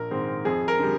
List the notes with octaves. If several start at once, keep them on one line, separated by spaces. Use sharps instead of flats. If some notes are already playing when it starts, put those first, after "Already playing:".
Already playing: A#1 A#4
G#2 D#3 G#3 C4
F2 G#4
A#4
D3 G3